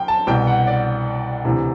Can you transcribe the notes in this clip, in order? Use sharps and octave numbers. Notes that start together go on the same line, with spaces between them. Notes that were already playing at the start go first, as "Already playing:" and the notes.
Already playing: F#2 G5
A5
C2 B2 G5
F#5
D5
D2 C3 E3